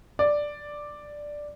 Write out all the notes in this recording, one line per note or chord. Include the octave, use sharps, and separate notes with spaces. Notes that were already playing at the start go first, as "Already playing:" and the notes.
D5